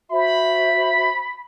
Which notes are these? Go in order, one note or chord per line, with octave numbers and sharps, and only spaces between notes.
F#4 C5 E5 B5